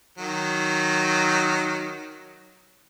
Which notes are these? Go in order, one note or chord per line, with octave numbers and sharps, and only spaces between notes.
D#3 F#3